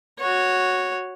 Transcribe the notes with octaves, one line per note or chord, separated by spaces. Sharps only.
F#4 C#5